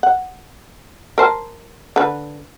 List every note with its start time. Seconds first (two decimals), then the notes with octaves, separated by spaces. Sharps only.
0.03 F#5
1.18 A#4 C5 A5
1.96 D3 B4